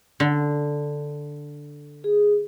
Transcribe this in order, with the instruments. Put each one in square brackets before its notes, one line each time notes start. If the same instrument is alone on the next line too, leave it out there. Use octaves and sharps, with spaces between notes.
[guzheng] D3
[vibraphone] G#4